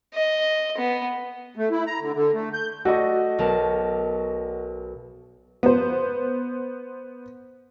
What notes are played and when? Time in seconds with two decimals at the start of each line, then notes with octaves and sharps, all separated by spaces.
0.14 D#5
0.77 B3
1.55 A3
1.71 E4
1.86 A#5
2.00 D3
2.13 D3
2.33 A3
2.53 G6
2.85 A3 F#4 D5 D#5
3.38 B1 A#4 A5
5.63 B3 C5